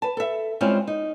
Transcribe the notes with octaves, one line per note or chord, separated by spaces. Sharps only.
B4 A5
A4 E5
G3 G#3 C4 C#4 E4 F4
D#4